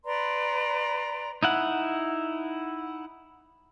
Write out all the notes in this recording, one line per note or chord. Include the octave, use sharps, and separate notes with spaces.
B4 D5 A#5 C6
D#4 E4 F#5